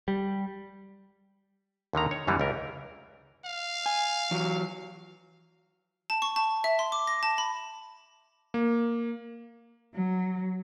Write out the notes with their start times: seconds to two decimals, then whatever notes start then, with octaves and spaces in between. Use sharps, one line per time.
0.08 G3
1.93 D#2 D3 D#3 A#5
2.11 C#5
2.27 F#2 D3 E3 G3 A#3
2.40 C#2 A#4
3.45 F5
3.86 G#5
4.31 E3 F#3
6.10 A5
6.22 C#6
6.36 A5
6.64 E5
6.79 C6
6.92 D6
7.07 A#6
7.23 A5
7.38 B5
8.54 A#3
9.95 F#3